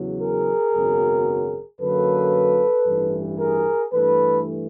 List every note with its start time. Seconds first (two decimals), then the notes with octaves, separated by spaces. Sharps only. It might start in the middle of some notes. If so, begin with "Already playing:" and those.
Already playing: E2 C#3 F#3
0.21 G#4 A#4
0.74 G#1 F#2 C#3 F#3 B3
1.80 F#2 D3 F#3 A#3 A4 B4
2.86 A1 G2 E3
3.40 G#4 A#4
3.93 G2 E3 A3 A4 B4